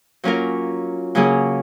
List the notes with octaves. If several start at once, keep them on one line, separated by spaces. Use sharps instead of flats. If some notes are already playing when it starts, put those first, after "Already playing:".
F#3 A#3 C#4 F4 A#4
C#3 F#3 A#3 C#4 G#4